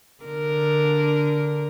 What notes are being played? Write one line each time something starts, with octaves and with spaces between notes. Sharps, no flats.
D3 A#4